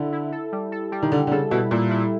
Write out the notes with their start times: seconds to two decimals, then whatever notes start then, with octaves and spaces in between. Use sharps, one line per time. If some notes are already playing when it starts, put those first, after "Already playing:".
Already playing: D3 E4 A4
0.12 E4
0.32 A4
0.52 G3
0.72 A4
0.92 G3
1.03 D#3
1.11 D3 G3
1.27 D3
1.31 C#3 A4
1.51 B2 E4
1.71 A#2 E4
1.91 E4